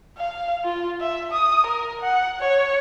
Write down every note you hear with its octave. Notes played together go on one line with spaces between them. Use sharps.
F5
F4
E5
D#6
A#4
F#5
C#5